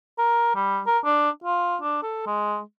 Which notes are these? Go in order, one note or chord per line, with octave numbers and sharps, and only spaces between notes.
A#4
G3
A#4
D4
F4
D4
A4
G#3